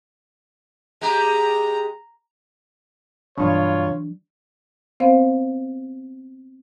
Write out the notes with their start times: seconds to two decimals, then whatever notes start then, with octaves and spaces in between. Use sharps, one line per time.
1.01 G#3 G4 A#5
3.38 G2 B2 E3 F#3 D4 F4 C#5
5.00 B3 C4 C5 F5